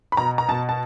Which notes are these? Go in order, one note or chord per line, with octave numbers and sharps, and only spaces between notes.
B5
B2 A#5
A#5
B2 A5
A5